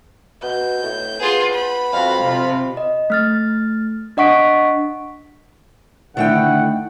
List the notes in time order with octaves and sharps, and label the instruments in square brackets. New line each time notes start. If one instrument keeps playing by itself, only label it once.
[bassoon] B2 [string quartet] G6
[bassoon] A2
[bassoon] B3 [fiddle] F4 G#4
[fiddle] B5
[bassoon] F2 [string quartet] F#4 F5
[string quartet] C3 F4
[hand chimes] D#5
A3 F6 A6
D4 D#5 F#5 C#6 B6 D7
[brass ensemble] D3 E4 F#5 [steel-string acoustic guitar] D#3 A3 G5